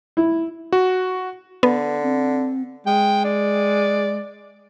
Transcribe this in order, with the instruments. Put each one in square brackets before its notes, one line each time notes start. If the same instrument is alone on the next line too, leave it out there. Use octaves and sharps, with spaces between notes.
[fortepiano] E4
[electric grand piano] F#4
[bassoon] D3 [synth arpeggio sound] B3
[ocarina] C4
[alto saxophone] G#3 [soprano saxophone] G5
[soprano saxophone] D5